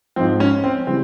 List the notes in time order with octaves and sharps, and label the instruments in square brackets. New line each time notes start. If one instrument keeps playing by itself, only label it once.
[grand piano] G#2 F3 C4
C#4
C4
C#3 E3 G3 C4